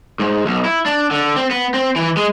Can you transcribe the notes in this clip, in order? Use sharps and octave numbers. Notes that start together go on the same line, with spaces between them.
G#2
B1
E4
D4
D3
C4
B3
C4
E3
G#3